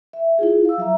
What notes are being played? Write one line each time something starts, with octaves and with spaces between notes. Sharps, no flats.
E5
E4 F4 G#4
F5 E6
F#3 E5 A#5